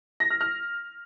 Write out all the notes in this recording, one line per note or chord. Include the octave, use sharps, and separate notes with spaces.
A#6
F6
F6